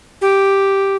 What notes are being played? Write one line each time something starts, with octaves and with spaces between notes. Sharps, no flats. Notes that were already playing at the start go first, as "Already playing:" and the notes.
G4